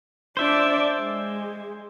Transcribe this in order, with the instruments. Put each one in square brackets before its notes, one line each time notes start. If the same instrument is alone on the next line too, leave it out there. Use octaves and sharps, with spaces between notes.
[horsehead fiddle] D4 D5 [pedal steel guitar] C5 E5
[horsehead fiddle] G#3